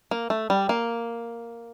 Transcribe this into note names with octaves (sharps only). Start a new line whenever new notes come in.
A#3
A3
G3
A#3